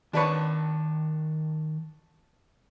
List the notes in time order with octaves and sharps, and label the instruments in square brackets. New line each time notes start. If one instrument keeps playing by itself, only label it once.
[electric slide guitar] D#3 A5 [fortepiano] D4 B4 C#5